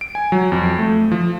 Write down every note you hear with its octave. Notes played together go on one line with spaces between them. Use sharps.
D7
G#5
F#3
F2
A3
F3